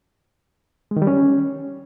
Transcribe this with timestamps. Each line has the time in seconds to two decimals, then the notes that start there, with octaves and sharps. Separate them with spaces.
0.91 G#3
0.96 D#3
1.02 G3
1.07 C#4